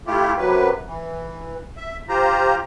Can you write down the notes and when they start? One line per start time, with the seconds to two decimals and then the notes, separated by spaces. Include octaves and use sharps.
0.07 A3 E4 F4 G4
0.38 F#2 C3 F#3 B4
0.87 E3
1.77 E5
2.09 F4 G4 C5 A#5